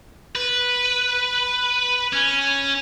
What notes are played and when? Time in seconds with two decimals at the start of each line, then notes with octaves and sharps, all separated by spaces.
0.36 B4
2.13 C#4